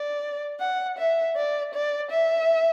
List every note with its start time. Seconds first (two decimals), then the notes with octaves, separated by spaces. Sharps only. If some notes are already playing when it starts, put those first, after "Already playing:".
Already playing: D5
0.60 F#5
0.98 E5
1.36 D5
1.74 D5
2.11 E5